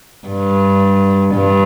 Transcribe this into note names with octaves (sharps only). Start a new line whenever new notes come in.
G2
G2